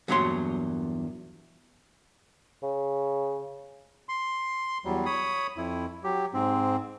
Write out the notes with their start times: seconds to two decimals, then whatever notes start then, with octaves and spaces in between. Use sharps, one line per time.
0.08 E2 G2 A#2 F#3 C#5 C6
2.63 C#3
4.09 C6
4.85 E2 F#3 G3
5.06 C#5 B5 D#6
5.57 F2 E4
6.04 F#3 G4
6.34 G#2 C4